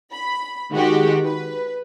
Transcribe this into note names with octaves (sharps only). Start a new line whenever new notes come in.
B5
D#3 G#3 F#4 G4
B4